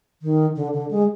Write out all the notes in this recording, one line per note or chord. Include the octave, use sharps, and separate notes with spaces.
D#3
D3
D3
G#3